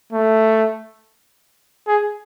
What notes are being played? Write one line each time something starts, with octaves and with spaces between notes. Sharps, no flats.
A3
G#4